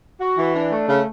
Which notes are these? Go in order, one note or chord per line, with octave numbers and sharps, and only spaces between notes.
F#4
E3
D4
A3
C#3